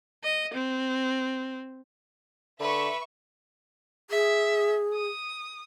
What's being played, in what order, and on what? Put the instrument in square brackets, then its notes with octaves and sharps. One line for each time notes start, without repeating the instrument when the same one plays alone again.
[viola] D#5
C4
[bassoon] D3 [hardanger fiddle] B4 [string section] E5 C#6
[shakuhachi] G#4 [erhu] E5
[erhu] D#6